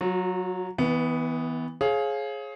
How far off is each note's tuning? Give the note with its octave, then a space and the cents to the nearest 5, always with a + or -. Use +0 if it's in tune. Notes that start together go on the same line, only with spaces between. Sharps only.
F#3 +0 F#4 -45
E3 -30 B3 +5
G#4 +20 C#5 -35 F5 +0